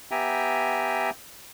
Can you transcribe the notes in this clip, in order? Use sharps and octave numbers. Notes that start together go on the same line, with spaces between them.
B3 G4 E5 G5 G#5 A#5